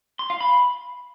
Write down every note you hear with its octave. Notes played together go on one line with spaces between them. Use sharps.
C6
F5
B5